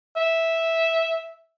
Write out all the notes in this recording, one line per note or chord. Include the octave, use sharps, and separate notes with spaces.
E5